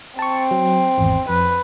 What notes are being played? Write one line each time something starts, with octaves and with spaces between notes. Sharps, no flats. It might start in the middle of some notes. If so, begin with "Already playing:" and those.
C4 A5 C#6
F#3
G#1 E2
F2 B4